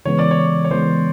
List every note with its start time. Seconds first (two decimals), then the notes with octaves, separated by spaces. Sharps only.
0.05 C#3 E3 G#3 B3 C#5
0.19 D5
0.31 C#5
0.65 C#5
0.71 C#3 E3 G#3 B3 C5